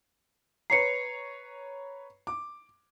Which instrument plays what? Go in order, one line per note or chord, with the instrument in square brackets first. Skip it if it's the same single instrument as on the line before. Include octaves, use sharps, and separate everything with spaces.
[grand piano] B4 C#5 A#5 [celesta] C7 C#7
[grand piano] D6